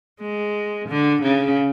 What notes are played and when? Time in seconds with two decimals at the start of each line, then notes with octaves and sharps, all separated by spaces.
0.21 G#3
0.88 D3
1.22 C#3